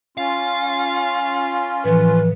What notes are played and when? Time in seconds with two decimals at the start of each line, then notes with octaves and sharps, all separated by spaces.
0.17 C#4 F4 F5
1.84 A2 E3 F3 B4